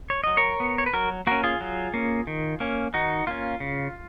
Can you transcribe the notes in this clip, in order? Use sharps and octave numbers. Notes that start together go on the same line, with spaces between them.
C#5
F#3 D#5
A#4 C#5
B3
C#5
B4
F#3 F#4 A#4
A#3 C#4 F#4 A#4
F4 G#4
F#3
A#3 C#4
D#3
A#3 C#4
D#3 D#4 F#4
A#3 C#4 F4
C#3